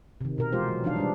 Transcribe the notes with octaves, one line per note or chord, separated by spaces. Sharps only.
C3 D#3
B2 A#4
E3 G#3 F4 G4 C5
F#3
E3 F3 D4 D#4 F5
G3 G#3 D4